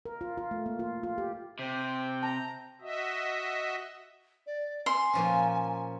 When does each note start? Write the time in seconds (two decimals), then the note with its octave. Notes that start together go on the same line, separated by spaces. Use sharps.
0.06 A#4
0.21 F4
0.38 F4
0.51 A3
0.66 A#3
0.79 F4
1.03 F4
1.18 G4
1.59 C3 C5 G5
2.23 A5 A#5
2.81 F#4 D#5 E5
4.47 D5
4.86 G#5 C6
5.13 A#2 F3 C#4